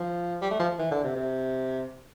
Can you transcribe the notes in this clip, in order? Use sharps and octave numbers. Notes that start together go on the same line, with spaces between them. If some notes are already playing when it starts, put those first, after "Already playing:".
Already playing: F3
G3
A3
F3
E3
D3
C3
C3